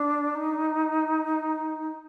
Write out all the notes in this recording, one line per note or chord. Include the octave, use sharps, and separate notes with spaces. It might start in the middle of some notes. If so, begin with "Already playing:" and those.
Already playing: D4
D#4